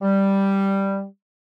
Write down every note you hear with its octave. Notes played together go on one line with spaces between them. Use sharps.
G3